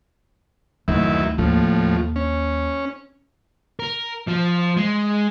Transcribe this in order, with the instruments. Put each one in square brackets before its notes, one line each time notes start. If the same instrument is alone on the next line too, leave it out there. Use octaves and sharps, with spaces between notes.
[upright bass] D1 [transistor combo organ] F#2 D#3 E4
[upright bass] D#2 [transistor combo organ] A2 F3
[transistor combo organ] C#4
[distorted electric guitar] A#4
F3
G#3